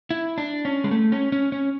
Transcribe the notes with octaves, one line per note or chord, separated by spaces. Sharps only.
E4
D4
C#4
G#3
A3
C#4
C#4
C#4